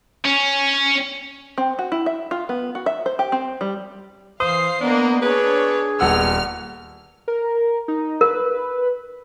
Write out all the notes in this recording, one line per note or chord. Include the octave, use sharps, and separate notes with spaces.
C#4
C4
F#4
E4
E5
F4
B3
F#4
E5
C5
G4
C4
G3
E3 C5 F5 D#6 C7
A#3 B3 D4 A#4 D#5
D4 G#4 B4 C#5
D#1 B3 F#5 E6 F6
A#4
D#4
A#4 B4